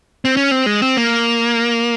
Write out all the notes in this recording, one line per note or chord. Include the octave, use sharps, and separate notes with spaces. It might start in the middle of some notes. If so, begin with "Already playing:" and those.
C4
C#4
C4
G#3
C4
A#3